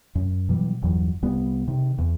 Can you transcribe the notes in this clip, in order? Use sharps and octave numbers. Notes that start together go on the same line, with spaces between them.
F#2
B2 E3 F#3 G3
G1 E2 E3 F#3
C2 G3 B3
C3 D#3
E2